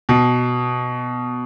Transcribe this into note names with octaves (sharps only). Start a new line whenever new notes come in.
B2